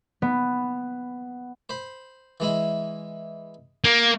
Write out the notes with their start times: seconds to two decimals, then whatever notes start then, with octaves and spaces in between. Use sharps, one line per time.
0.22 B3
1.69 C5 B5
2.40 E3 G#3 E4
3.84 A#3